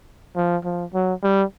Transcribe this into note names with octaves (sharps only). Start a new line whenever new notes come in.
F3
F3
F#3
G3